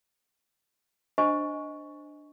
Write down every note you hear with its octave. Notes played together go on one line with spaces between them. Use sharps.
D4 C5 D#5 G#5 C#6